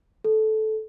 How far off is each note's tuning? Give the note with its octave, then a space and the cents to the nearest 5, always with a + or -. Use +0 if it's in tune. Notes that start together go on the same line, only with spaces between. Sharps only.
A4 -15